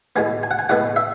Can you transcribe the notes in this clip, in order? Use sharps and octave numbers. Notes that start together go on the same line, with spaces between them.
A2 G#3 B3 G#5
G#5
F#5
G#5
A2 G#3 B3 F#5
E5